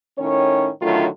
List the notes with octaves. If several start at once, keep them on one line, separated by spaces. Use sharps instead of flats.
A2 D#3 C#4 C#5
A2 D3 D#3 F#3 A3 F4